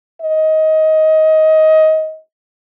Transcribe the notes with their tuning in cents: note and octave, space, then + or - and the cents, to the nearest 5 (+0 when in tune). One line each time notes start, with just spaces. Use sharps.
D#5 +20